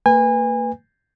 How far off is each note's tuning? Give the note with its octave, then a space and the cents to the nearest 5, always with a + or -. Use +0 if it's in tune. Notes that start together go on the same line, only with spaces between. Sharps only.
A#3 -35 B4 +0 G#5 -30